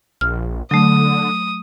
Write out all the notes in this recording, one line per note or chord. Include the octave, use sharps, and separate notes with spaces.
A#1 F6
D3 F#3 A3 D#6